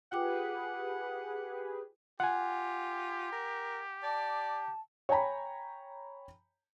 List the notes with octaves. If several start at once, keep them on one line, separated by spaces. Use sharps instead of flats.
F4 G4 G#4 B4 F#5 G5 D6
F4 G4 F#5 G#5
A#4
D5 A5
C#5 G5 G#5 A#5 B5